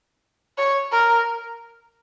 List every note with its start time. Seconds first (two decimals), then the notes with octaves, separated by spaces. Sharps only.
0.58 C#5
0.92 A#4